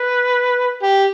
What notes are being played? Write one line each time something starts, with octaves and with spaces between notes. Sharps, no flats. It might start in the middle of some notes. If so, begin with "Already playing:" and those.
Already playing: B4
G4